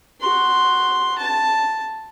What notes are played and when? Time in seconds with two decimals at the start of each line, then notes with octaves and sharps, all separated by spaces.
0.20 F#4 C6
1.18 A5